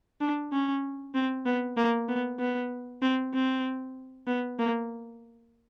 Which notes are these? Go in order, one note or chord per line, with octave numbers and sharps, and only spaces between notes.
D4
C#4
C4
B3
A#3
B3
B3
C4
C4
B3
A#3